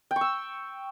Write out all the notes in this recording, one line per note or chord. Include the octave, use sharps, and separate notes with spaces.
G5
C#6
E6